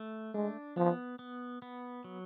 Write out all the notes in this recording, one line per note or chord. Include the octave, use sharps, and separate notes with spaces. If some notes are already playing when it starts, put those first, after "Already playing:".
Already playing: A3
G#3 D4
F3 B3
B3
B3
F#3